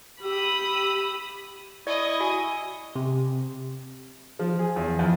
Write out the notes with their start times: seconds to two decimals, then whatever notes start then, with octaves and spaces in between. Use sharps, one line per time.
0.23 G4 B5 D#6 E6
1.87 E4 D5 D#5 C#6 D#6
2.20 F#4 G#5
2.96 C3
4.39 F3
4.59 G#4
4.76 E2
4.99 F2